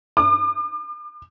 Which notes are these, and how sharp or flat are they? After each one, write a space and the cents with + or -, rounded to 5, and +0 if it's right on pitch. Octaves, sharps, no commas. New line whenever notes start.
D6 +40